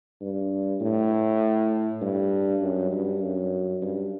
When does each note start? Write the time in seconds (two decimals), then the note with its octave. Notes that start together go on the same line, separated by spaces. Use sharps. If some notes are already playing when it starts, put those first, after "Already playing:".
0.21 G2
0.81 A2
2.02 G2
2.62 F#2
2.92 G2
3.22 F#2
3.82 G2